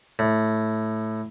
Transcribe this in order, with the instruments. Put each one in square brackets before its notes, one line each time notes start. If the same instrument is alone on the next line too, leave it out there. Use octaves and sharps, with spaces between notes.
[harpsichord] A2